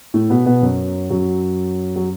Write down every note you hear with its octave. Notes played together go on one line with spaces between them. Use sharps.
A2 A3
B2 B3
B2 B3
F#2 F#3
F#2 F#3
F#3